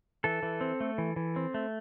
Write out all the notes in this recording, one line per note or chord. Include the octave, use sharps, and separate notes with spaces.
E3 A4
E3
C4
A3
E3
E3
C4
A3